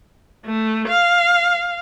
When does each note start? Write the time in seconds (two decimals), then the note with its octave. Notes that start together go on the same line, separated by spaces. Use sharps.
0.46 A3
0.88 F5